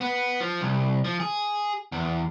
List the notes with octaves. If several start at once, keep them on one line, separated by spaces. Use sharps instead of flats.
B3
F3
C2
F3
G#4
E2